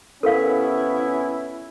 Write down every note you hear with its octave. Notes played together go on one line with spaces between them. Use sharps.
C3 B3 C#4 E4 A4 A#4 F5